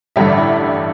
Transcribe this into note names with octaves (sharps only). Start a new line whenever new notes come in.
A1 G2 D3 G3 E5
D5
E4 E5